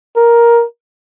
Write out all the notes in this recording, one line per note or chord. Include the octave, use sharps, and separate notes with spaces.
A#4